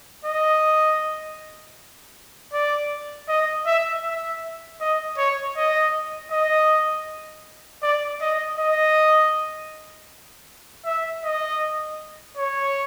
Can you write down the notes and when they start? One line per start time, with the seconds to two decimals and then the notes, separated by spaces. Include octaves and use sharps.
0.25 D#5
2.53 D5
3.28 D#5
3.66 E5
4.04 E5
4.80 D#5
5.17 C#5
5.56 D#5
6.32 D#5
7.83 D5
8.22 D#5
8.58 D#5
10.85 E5
11.24 D#5
12.37 C#5